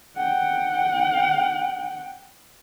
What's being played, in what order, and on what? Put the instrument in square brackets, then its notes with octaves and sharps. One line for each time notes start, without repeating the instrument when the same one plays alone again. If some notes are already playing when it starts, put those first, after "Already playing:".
[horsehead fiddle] F#5 G5